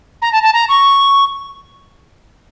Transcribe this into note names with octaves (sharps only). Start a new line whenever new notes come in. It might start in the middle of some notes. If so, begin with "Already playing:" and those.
A#5
A5
A5
A#5
C#6